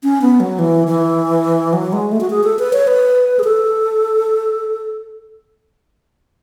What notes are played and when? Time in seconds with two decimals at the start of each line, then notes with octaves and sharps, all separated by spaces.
0.03 C#4
0.21 B3
0.40 F#3
0.59 E3
0.87 E3
1.73 F#3
1.93 G#3
2.12 A3
2.21 F#4
2.30 G#4
2.44 A4
2.59 B4
2.73 C#5
2.87 B4
3.39 G#4
3.44 A4